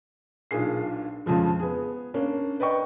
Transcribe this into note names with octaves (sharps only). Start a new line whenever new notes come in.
B1 A#2 D4 G#4 C7
F2 C#3 F3 G#3
B3 G#4
A#3 C#4 D4
B4 D5 D#5 G5 C#6